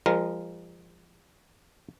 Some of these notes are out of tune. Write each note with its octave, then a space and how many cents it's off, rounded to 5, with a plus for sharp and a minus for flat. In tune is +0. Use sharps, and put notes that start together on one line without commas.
F3 -15 G#3 -40 A#4 +0